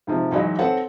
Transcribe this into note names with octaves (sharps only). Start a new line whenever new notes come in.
G#2 C3 F3
G#2 E3 F#3 D#4 E4
C4 A4 B4 C#5 F#5